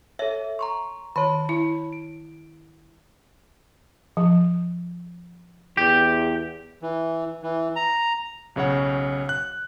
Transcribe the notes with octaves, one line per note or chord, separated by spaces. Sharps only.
A4 C#5 E5
A#5 C6 C#6
D#3 C#5 A5 B5
E4
D7
F3
E2 G4
E3
E3
A#5
B1 C#3 C#5 F#5
F#6